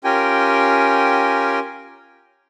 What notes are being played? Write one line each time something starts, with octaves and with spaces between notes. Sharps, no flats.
C#4 F4 G4 A#4 G5 G#5